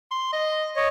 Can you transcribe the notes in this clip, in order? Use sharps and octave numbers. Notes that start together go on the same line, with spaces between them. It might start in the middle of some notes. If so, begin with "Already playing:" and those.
C6
D#5
C#5 D#5